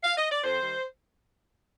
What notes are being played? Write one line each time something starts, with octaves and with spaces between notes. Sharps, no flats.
F5
D#5
D5
F2 C5
D#3 G3